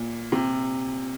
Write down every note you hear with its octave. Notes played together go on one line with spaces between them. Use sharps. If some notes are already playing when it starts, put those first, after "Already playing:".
Already playing: A#2
C3